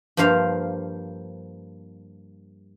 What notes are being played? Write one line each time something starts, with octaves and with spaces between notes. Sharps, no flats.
G2 F3 A#3 C5 F5